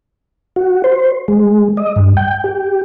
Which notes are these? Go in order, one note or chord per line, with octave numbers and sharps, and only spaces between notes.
F#4
C5
G#3
D#5
G2
G5
G4